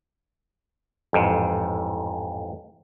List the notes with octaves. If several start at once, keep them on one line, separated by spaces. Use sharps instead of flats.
A1 F2 G#2